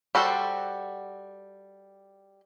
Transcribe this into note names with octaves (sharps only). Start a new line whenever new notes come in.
G3 F#4 G4 A4 C5